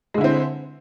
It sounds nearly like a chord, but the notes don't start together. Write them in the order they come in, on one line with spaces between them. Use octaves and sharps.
G#3 D3 E4 C4